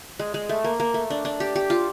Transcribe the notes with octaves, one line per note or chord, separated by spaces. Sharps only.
G#3
G#3
A3
A#3
A#3
A3
D4
D4
G4
G4
F4